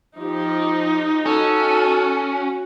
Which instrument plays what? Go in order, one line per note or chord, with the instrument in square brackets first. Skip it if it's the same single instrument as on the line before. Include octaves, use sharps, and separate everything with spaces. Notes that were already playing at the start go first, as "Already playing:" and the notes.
[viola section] F3 G4 [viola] D#4
[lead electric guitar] C#4 [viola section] F#4 [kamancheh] A4